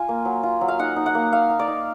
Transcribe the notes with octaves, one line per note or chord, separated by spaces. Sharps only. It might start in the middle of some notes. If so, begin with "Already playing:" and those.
Already playing: F4 G#5
A#3
F#3
F4
F#3
F5
D#4 F#5
D#4
F#5
A#3
A#3 F5
D#4
D5
D#4